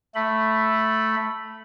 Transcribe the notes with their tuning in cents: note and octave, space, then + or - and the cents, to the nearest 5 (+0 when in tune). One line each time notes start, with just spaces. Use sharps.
A3 +0 B5 +0